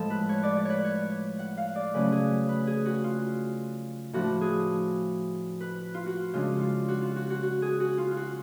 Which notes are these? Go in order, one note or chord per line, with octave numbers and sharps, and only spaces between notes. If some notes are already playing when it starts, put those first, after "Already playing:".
Already playing: A2 F3 G#3 A4
B4
C#5
D5
D5
B4 C#5
C#5
F#5
F5
D5
C#3 F#3 A3 C#4 B4
G#4
B4
G#4
F#4
F4
A2 F3 A3 D4 F#4
G#4
B4
F4
F#4
C#3 G#3 D4 F4
F4
F#4
F4
F#4
F#4
F#4
G#4
F#4
F4
F4
F#4